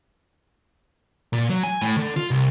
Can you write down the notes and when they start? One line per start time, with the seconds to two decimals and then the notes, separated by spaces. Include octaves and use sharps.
1.33 A#2
1.50 F#3
1.63 G#5
1.82 A2
1.97 D3
2.16 F4
2.31 C2